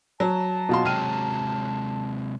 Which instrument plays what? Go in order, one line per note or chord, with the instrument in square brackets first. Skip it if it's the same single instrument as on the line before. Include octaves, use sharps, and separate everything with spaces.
[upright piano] F#3 [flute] A5
[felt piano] B2 F4 C6
[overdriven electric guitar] C3 G#3 [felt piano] G5 F6 D#7